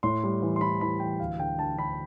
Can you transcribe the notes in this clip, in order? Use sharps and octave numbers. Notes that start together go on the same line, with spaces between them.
A2 C6
G3
E3
C6
E3 B5
E3 B5
E3 G5
D2 F5
D3 G5
D3 A5
D3 B5